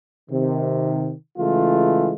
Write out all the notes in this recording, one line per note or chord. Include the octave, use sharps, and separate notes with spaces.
C3 D#3
C#3 E3 G#3 A3 F4